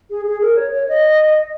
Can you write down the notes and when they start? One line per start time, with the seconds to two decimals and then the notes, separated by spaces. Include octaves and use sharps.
0.10 G#4
0.26 G#4
0.41 A#4
0.56 C#5
0.73 C#5
0.88 D#5